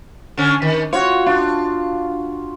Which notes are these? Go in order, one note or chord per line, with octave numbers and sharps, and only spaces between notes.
D3 C#4
D#3
F4 F#4 C#5
D4 F4